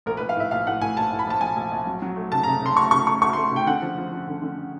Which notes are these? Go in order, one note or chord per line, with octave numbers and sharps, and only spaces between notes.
A#1 A#4
B4
A#1
F5
A2 E5
A#1 F5
A2 F#5
A2 G#5
A#1 A5
A2
B5
A#1 A5
A#1 G#5
A#1
A#1
F#3
F#3
A3
C#3 A5
A#5
C#3
C#3 C6
D2 C#6
C#3 C#6
A3 C#6
D2 C#6
C6
A3
C#3 G5
D3 F#5
F3
F3
F3
D3
D3